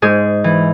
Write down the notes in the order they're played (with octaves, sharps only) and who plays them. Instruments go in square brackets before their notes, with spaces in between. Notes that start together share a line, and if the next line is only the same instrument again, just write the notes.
[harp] G#2 G#4
E3